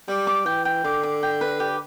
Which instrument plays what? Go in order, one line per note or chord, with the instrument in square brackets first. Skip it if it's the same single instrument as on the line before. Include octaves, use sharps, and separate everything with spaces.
[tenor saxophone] G3 [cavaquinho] D6
[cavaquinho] D6
[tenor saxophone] E3 [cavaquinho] G5
[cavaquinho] G5
[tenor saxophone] D3 [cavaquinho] D6
[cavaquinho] D6
G5
B4
G4